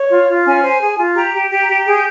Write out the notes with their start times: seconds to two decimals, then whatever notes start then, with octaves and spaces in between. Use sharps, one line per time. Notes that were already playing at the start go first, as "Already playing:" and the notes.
Already playing: C#5
0.10 F4
0.28 F4
0.46 C#4 G#5
0.63 C5
0.81 G#4
0.99 F4
1.15 G4 A#5
1.34 G4
1.51 G4
1.63 A#5
1.68 G4
1.86 G#4 G6